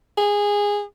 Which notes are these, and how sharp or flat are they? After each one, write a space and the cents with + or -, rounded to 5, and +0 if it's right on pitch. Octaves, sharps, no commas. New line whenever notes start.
G#4 -15